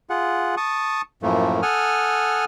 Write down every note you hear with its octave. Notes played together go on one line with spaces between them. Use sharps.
F4 G#4 F#5
A5 C#6 D#6
F#2 A2 F3 A3 A#3
A4 F#5 G#5 D#6 F6